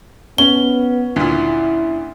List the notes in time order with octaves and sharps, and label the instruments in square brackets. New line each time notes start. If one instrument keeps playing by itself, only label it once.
[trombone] B3 [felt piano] C#4 [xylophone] G7
[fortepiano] D2 A#2 [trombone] E4